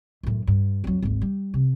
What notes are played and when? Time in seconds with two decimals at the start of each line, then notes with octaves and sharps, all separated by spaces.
0.23 F#2 A2
0.47 G2
0.84 F2 F#3
1.02 G#1 D2
1.22 G3
1.54 C3